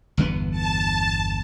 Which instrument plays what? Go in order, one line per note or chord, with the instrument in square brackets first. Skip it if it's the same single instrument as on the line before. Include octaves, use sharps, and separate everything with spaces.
[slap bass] G1 E2 B3
[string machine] A5